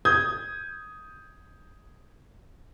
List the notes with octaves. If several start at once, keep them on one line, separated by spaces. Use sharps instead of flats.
D#6 G6 G#6